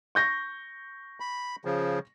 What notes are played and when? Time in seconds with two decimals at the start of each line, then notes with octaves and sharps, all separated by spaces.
0.15 C#6 G6 A#6
1.20 B5
1.65 C#3 F3